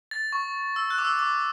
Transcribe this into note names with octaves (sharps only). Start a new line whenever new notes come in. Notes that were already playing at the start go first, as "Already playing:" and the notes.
A6
C#6
E6
F#6
D6
E6
D6